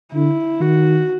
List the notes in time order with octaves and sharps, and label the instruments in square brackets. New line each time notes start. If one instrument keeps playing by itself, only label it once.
[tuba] D3 [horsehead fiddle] E4
[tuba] D#3 [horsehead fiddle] F#4